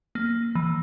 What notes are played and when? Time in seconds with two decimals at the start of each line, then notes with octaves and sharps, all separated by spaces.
0.15 A#3
0.55 E3